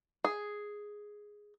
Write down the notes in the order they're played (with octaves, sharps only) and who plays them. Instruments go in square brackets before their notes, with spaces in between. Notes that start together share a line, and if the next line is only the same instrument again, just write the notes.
[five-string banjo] G#4